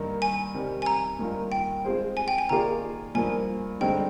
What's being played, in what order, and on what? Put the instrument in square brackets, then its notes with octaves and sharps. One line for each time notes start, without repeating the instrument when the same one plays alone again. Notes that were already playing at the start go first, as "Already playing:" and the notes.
Already playing: [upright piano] G2 D#3 A#3 D#4 A#4
[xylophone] G#5
[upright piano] C3 D#3 G3
[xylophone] G#5
A#5
[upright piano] G2 D#3 A#3 F4 A#4
[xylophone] G5
[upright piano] G#3 C4 F4 G#4 C5
[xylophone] G#5
G5
G#5
[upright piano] D#3 A#3 F4 G#4 D5 [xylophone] A#5
[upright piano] G2 F3 A#3 [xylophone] G#5
[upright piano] G2 D3 G#3 C4 D#4 [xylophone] G5